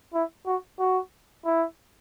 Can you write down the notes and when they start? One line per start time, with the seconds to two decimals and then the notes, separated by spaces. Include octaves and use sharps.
0.14 E4
0.46 F#4
0.79 F#4
1.45 E4